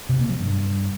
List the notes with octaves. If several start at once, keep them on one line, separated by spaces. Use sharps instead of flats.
C3
A#3
F#3
G2